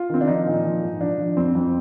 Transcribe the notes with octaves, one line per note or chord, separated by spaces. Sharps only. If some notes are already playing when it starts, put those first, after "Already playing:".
Already playing: F4
D#3 C4
D4
F3 D#4
A#2
F3
G#2
F3 D4
F3
F2 C4
F2